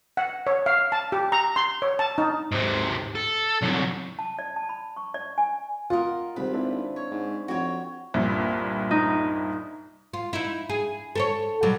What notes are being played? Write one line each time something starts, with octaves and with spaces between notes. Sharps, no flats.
F#5
C#5
F5
A5
G4
A#5
C6
C#5
A5
D#4
G#2 C3
A4
C2 F#3
A5
D5
A5
B5
C#6
D5
G#5
F4 A#4 D#5 F#5
G#1 C3 G3 B4 C5 B5
C4 D4 E4
C#5
G#2
F2 F#4 G4 C#5
C2 G2 A#2
D#4
F4
D#4 E4
G#4
A4 A#4 C#5
B2 F#3 G3